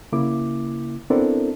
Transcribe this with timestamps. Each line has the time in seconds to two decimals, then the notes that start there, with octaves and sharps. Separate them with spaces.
0.12 C#3 A#3 E4 D6
1.10 B3 C4 D4 E4 A4 A#4